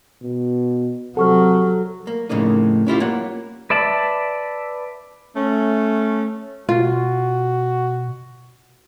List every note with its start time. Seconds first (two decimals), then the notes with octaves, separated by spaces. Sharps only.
0.22 B2
1.17 C3 F#3 A4 F#5 C#6 F6
2.07 A#3
2.30 F2 A2 C#3 A#3 D#4
2.86 C#4 E4 F4 G4
3.00 A#3 C#5 F#5
3.70 B4 D5 E5 A5 B5
5.36 A3 C#4
6.69 B2 F4 F#4